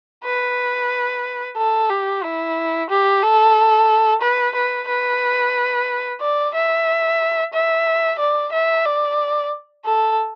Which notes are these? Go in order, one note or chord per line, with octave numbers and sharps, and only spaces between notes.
B4
A4
G4
E4
G4
A4
B4
B4
B4
D5
E5
E5
D5
E5
D5
A4